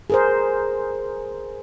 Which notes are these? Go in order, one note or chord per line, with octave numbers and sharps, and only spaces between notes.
G#4 A#4 C5